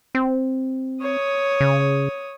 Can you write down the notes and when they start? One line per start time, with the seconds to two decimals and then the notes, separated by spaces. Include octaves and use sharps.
0.15 C4
1.02 C#5 D#6
1.61 C#3